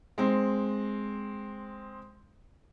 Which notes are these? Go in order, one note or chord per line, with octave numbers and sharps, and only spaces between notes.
G#3 C4